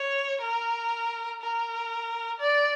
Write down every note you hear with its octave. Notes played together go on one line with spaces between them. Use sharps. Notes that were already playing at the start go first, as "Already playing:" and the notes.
Already playing: C#5
A#4
A#4
D5